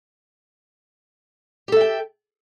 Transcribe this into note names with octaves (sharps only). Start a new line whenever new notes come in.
G4 A4 E5 G5